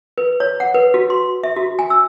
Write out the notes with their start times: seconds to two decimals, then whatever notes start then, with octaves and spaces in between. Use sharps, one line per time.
0.18 B4
0.40 C#5
0.60 F#5
0.74 B4
0.94 F#4
1.10 C6
1.44 E5
1.56 F#4
1.79 G#5
1.90 E6